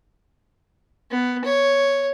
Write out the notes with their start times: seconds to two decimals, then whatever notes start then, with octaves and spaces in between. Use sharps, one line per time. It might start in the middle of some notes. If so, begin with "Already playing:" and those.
1.11 B3
1.45 C#5